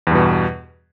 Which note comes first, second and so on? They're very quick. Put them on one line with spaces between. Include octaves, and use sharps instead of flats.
E2 G2 B2